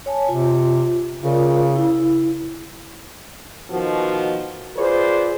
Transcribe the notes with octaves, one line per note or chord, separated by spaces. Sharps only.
C#5 G#5 A5
C3 F4
C#3 F4 A#4 D5
E4
B2 D#3 F3 F#4
F4 G#4 B4 C5 D5